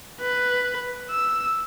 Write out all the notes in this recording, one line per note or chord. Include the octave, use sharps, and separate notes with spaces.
B4
E6